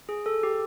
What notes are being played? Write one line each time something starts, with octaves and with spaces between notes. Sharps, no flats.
G#4
A4
G4